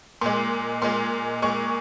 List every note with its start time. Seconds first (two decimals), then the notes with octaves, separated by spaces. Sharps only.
0.21 A#2 G#3 C6
0.82 A#2 G#3 C6
1.42 A#2 G#3 C#6